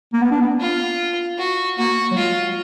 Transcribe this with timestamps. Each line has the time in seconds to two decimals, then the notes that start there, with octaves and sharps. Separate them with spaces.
0.13 A#3
0.21 B3
0.31 D4
0.41 B3
0.60 F4
1.38 F#4
1.78 A#3 F#4
2.11 F#3
2.17 G#3 F4